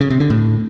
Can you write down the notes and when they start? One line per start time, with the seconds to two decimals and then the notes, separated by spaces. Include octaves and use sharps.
0.01 C#3
0.10 C3
0.20 D3
0.30 A2